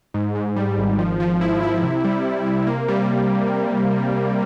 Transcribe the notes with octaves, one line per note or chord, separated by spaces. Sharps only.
G#2
G#2
G3
G#1
F3
F3
E4
E4
C3
G3
C3
C3
A#3
G3